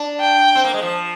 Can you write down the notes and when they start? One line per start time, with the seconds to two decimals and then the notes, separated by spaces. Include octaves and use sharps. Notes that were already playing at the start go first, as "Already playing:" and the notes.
Already playing: D4
0.20 G5
0.55 C4
0.64 A#3
0.74 G#3
0.82 F3